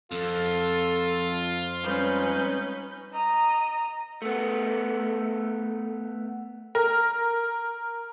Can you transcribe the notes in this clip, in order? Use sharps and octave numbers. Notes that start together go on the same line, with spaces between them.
F2 F4 A4
G3 G#3 C#4 D#4 B4 G6
D#5 A#5
A3 B3
A#4